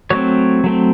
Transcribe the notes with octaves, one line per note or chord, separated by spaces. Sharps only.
F#3 A3 C4 C#5
F#3 A3 C4